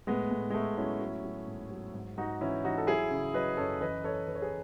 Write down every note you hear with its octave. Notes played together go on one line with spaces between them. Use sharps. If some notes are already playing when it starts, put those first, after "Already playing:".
A2 G#3 B3
A2
G#3
A2 A3
F#3 C#4 E4
F#3
F#3
G#2
F#3
G#2
G#2 D#4 F#4
E3 C#4 E4
E3 D#4 F#4
A4
F#3 E4 G#4
C#3
F#3 B4 D#5
F#2 A4 C#5
E3 B4 D#5
E3 A4 C#5
E3 B4
C#5
G#4 B4